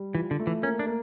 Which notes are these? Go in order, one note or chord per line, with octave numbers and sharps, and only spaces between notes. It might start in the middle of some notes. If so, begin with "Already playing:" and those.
Already playing: G3
E3 F4
D3
A3
E3
A#3 C#4
D4
A#3